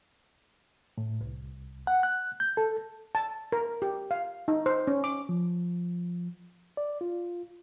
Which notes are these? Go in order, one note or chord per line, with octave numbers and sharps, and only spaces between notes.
A2
C2
F#5
F#6
G6
A4
A5
A#4
G4
F5
D#4
C5
C#4
D6
F3
D5
F4